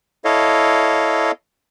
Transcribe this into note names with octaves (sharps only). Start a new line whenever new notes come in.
E4 A4 C#5 D#5 F5